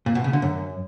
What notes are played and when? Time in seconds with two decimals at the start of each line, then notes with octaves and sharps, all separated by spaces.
0.06 A#2
0.15 B2
0.24 C#3
0.33 D3
0.42 F#2